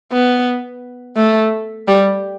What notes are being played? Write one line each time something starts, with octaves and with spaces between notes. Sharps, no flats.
B3
A3
G3